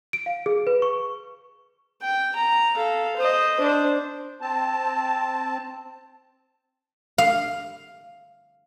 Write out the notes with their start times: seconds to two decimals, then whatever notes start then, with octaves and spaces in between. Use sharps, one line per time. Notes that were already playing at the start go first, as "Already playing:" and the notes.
0.13 D7
0.26 F5
0.46 G#4
0.67 B4
0.82 C#6
2.02 G5
2.35 A#5
2.75 A4 F5
3.17 C5 D#5
3.60 D4 C5
4.41 C4 A5
7.18 F5